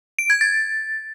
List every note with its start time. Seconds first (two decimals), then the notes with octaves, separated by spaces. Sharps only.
0.19 D7
0.30 G#6
0.41 A6